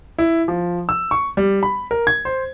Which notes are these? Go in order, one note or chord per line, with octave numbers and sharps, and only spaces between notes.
E4
F3
E6
C#6
G3
B5
A#4
G#6
C5